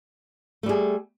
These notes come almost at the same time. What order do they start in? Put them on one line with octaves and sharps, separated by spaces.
A3 G3 G#4